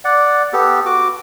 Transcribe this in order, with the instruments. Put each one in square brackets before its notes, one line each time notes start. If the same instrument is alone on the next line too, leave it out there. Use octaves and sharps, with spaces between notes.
[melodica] D5 F#5
B3 G4 A4
F#4 D6